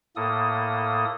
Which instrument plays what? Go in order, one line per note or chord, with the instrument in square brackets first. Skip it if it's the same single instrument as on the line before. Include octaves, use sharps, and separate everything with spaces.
[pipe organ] A2 A#3 A4 D#6